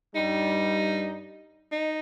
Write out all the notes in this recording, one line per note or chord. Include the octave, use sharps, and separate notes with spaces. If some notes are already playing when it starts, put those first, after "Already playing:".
G2 G3 D#4
D#4